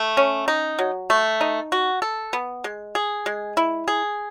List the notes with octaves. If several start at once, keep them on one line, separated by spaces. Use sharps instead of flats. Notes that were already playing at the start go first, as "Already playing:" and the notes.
Already playing: A3
C#4
D#4
F#3
A3
D#4
F#4
A4
B3
G#3
G#4
G#3
E4
G#4